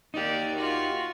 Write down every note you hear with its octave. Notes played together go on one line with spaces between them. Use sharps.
D#4 G4 A#4 D5
F4 F#4